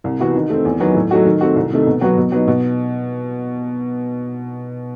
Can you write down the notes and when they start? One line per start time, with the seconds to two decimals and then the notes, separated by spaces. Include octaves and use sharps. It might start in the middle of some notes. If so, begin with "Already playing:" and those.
0.04 C2
0.19 C3 E3 B3 F#4
0.35 D#3
0.50 A3 C4
0.65 E2
0.80 D#3 F#3 B3
0.95 A2
1.11 F#3 A3 D#4 F#4
1.25 D#3
1.41 A3 C4 F#4
1.56 C2
1.71 C3 D#3 A3
1.87 B2
2.01 F#3 B3 F#4
2.17 B2
2.32 F#3 B3 D#4
2.48 B2